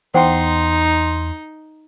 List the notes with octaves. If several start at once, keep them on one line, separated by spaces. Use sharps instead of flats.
E2 D#4 C5 F#5 G5 C6